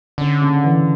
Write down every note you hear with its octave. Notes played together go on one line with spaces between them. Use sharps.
D3 C#4
C#3
E3